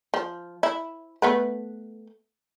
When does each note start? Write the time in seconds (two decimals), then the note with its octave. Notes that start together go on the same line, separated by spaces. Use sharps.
0.14 F3
0.63 E4
1.22 A3 B3 B4